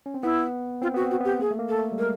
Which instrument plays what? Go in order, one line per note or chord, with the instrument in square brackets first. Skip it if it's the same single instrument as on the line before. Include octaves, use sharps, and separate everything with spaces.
[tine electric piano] C#4
C4
[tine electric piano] B3 [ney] E4
[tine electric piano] C4 [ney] F4
[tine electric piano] B3 [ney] F#4
[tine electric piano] C4
[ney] F#4
[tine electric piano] B3 [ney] G4
[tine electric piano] A#3 [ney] G#4
[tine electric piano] A3
A#3
[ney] A4
[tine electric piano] A3
G3
[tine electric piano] G#3 [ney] A#4